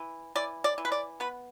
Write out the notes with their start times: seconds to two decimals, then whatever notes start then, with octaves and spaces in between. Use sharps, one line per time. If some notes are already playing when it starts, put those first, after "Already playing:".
Already playing: E3
0.35 E3 D5
0.64 D5
0.78 E3
0.85 B4
0.92 D5
1.20 B3 B4